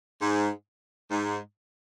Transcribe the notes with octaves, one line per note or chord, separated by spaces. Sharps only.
G#2
G#2